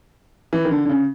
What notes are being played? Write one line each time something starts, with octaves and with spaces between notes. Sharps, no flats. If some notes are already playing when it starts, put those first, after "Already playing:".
E3
D#3
D3
D3
C#3